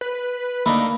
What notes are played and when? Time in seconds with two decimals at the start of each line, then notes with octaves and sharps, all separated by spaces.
0.01 B4
0.66 A3 A#3 D4 D#4 B5